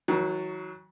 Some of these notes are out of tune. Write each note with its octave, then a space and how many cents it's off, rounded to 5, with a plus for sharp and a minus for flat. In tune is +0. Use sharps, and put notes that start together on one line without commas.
D#3 +45 F#3 +0